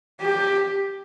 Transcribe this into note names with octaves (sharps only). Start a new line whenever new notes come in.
G4